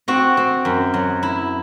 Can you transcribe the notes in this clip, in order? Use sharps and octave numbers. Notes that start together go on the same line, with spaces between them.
C4 F#4
C4
F#2
F#3
E4